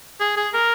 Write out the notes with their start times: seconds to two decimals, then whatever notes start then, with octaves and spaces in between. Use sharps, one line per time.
0.20 G#4
0.37 G#4
0.54 A#4